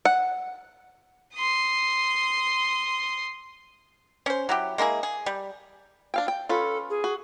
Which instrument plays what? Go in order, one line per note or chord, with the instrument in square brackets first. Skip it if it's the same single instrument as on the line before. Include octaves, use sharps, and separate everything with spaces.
[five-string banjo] F#5
[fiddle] C6 D#6
[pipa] C#4 C5
F#3 E4 G4
G#3 A#3 E4 G#4
G#4
G3
[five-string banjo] D4 F5 G5
G5
[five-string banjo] C#4 F4 B4 [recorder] A4
[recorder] G#4
[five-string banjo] F#4